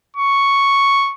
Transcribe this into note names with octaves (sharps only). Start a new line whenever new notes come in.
C#6